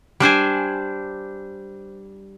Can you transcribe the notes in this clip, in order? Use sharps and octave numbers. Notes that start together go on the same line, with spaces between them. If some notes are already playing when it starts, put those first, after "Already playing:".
G3 D4 C5 G#5